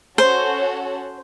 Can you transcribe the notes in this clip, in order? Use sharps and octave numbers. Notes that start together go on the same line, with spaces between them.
C#4 F#4 A4 C5 C#5 F#5